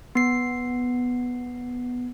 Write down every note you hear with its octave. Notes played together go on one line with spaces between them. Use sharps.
B3 C7